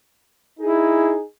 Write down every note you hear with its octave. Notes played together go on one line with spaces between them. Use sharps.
D#4 E4 G#4